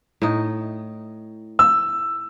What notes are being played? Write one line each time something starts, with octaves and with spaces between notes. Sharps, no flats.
A2 D#4
E6